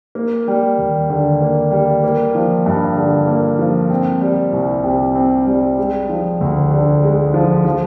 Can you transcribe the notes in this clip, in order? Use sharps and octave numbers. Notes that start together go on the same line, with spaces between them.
A#3
G3
D#2
D3
A#3
G3
A#3
F3
G2
D3
A#3
F3
C4
G3
C2
C3
C4
G3
G#3
F3
D2
D3
G#3
F3
F3